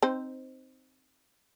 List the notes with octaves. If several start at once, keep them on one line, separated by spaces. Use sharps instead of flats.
C4 D#4 C5